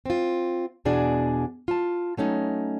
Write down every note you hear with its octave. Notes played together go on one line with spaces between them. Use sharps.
C4 F4
E2 B2 D4 G#4 D5 G#5
F4 A5
F#3 A3 C#4 D#4